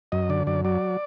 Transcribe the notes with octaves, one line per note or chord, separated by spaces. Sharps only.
F#2 D#5
D3 D5
F#2 D5
F#3 D5